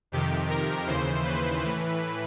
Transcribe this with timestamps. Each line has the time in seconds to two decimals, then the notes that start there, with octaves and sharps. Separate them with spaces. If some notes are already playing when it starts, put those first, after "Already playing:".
0.12 F2 C3 D#3 G4
0.49 A#4
0.87 D#2 C#3 E3 C5
1.24 B4
1.62 A2 E3